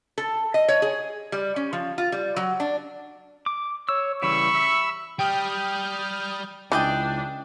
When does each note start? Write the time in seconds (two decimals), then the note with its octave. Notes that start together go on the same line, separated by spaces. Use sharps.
0.18 A4
0.54 D#5
0.68 C#5
0.82 G#4
1.32 G3
1.56 C#4
1.73 F3
1.98 F4
2.12 G3
2.36 F#3
2.60 D4
3.46 D6
3.89 C#5 E6
4.22 C#3 E3 G3 B5 C#6 E6
4.55 E5
5.19 G3 G4 G5 D#6 F6 G6
6.72 C#2 E3 D4 D5 D#5 G5